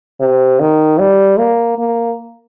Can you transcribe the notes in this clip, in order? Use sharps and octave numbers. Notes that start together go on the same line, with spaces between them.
C3
D#3
G3
A#3
A#3